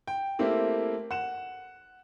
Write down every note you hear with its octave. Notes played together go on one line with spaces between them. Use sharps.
G5
A3 A#3 C4 E4 G4
F#5 E7